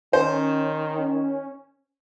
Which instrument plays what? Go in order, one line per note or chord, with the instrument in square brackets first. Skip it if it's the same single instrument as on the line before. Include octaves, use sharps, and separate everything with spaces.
[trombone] D#3 [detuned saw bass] C#4 [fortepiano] C5